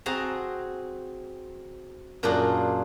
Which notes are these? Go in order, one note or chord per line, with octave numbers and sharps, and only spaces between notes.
C4 F#4 G#4 A5 A#5
F#2 A#2 D4 F4 G#4 F#5